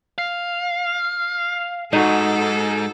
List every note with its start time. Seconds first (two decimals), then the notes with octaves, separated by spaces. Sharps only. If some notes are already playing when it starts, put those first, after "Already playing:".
0.18 F5
1.93 G#2 D#4 F#4 A4